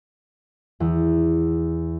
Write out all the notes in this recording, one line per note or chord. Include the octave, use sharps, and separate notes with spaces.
E2